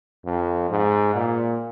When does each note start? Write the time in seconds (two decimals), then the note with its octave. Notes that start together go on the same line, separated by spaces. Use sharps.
0.25 F2
0.70 G#2
1.15 A#2